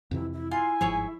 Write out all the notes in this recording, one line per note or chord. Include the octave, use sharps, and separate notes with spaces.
F2 C3 E3 E4
E4
E4 F4 G#5 C6
G1 G#2 F3 G#4 C#5 E5